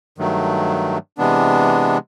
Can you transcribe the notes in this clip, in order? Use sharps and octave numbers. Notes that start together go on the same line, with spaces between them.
G2 D#3 F#3 A3
C3 E3 G#3 B3 D4